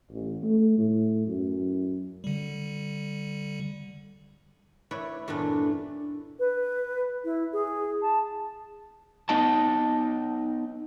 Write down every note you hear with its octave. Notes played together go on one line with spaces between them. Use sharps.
A1
A3
A2
F#2
D3 G3
E4 B4 C#5 D5
E2 G2 A#2 E3 A3 D4
B4
E4
G#4
A5
B3 D#4 D#5 A5